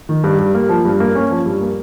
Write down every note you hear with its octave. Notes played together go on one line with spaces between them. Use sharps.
D#3
G2
G3
A#3
F3
G2
A#3
C#4
F3
G2
A#3